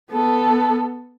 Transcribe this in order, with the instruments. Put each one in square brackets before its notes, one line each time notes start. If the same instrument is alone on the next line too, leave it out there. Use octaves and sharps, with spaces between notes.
[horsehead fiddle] B3 A4